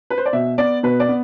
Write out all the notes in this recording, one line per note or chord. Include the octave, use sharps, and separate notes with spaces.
B4
C5
D5
B2 E5
B3 D5
B2 B4
D5
B3